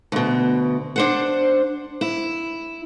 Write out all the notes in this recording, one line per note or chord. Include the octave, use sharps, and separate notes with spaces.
D2 B2
D4 C5 F#5
E4